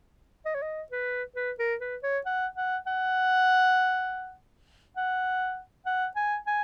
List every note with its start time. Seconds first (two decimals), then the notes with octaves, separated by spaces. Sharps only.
0.46 D#5
0.55 C#5
0.62 D#5
0.92 B4
1.36 B4
1.59 A#4
1.81 B4
2.03 C#5
2.26 F#5
2.56 F#5
2.86 F#5
4.97 F#5
5.86 F#5
6.16 G#5
6.47 G#5